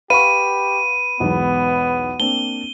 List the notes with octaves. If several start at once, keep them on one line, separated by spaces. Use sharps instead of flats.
G4 B4 F5 F#5 B5 C#6 D#7
B1 E2 G#2 B3
A#3 C4 D4 G7